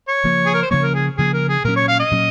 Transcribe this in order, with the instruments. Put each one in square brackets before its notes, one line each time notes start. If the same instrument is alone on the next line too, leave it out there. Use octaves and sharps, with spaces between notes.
[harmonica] C#5
[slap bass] C#3 F3 A#3
[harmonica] G#4
A#4
C5
[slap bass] C#3 F3 A#3 [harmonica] C#5
[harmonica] A#4
G#4
[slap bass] C#3 F3 A#3 [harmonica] G#4
[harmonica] A#4
G#4
[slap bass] A#2 F#3 C#4 [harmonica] A#4
[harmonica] C#5
F5
D#5
[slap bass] A#2 F#3 C#4